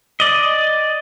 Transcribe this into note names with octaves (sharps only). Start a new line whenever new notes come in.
D5 D#5